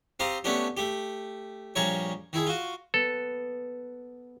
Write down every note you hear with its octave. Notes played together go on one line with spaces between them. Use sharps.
C4 G4 F5 A#5 D#6
A3 B3 C#4 D4 G4
A3 G4
A#1 G3 G#4 A#4 C#5
D#3 E4 G#4
F4 F#4
B3 A4